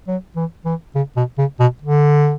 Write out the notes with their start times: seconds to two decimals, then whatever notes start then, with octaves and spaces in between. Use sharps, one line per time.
0.07 F#3
0.36 E3
0.65 E3
0.95 C#3
1.16 B2
1.38 C#3
1.60 B2
1.82 D3